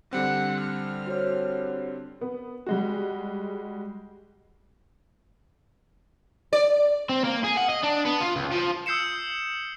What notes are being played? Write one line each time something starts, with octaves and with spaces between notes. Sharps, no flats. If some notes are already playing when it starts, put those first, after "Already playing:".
D3 G3 C4 F#5
F6
F#4 C5 C#5
B3
G3 G#3 F#4
D5
C4
A#3
G#4
F#5
D#5
D4
B3
F4
C#2
F3
D#6 E6 G6 C7 C#7 E7